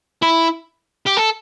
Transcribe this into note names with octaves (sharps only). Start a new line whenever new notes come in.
E4
G4
A4